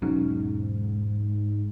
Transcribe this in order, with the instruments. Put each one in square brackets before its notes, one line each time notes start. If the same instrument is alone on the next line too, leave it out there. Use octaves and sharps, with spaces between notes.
[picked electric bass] E1 F#3 C#4 [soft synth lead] G#2